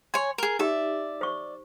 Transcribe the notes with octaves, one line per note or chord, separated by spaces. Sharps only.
C#5 G#5 C6
G#4 A#4
D#4 G4 D5 E5
C5 C#6